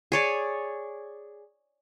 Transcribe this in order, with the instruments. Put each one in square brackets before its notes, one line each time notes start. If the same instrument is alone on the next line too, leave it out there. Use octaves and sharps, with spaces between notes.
[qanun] G#4 C#5 D5